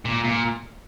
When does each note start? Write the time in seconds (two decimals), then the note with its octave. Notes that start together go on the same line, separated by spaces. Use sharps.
0.05 A#2
0.24 A#2